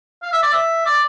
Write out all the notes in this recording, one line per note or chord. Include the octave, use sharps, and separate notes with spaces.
F5
E5
D5
E5
D5